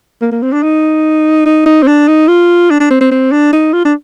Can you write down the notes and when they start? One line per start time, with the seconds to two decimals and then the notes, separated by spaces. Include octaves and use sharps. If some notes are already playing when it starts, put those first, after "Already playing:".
0.22 A#3
0.32 A#3
0.43 C4
0.53 D4
0.63 D#4
1.46 D#4
1.66 D#4
1.83 C4
1.88 D4
2.08 D#4
2.28 F4
2.70 D4
2.80 D4
2.91 C4
3.01 C4
3.11 C4
3.32 D4
3.53 D#4
3.73 F4
3.86 D4